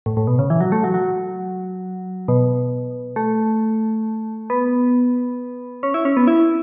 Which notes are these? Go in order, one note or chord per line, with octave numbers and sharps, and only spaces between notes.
A2
A2
B2
C#3
E3
F#3
A3
F#3
F#3
B2
A3
B3
C#4
E4
C#4
B3
E4